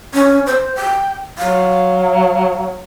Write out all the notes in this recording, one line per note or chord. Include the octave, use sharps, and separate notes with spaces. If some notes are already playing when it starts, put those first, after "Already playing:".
C#4
C5
G5
F#3 F5